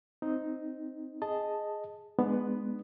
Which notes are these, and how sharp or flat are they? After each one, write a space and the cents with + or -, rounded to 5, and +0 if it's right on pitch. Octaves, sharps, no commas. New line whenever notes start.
C4 +0 D#4 +0
G#4 +0 D#5 +0 A5 +0
G#3 +5 B3 +0 D4 +30